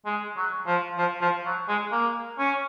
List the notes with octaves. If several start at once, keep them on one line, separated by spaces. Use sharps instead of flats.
G#3
F#3
F3
F3
F3
F#3
G#3
A#3
C#4